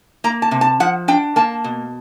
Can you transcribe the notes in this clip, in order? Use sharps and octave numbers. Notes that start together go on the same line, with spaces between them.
A#3 A#5
A5
C3
A5
F3 F#5
D4 G5
A#3 A5
B2